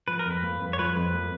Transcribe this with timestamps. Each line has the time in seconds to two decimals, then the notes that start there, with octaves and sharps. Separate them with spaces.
0.08 F3 B4
0.19 A#4
0.26 F2
0.31 B4
0.43 A#3
0.61 F2
0.73 C#5
0.79 F3 B4
0.96 F2 B4
1.13 A#3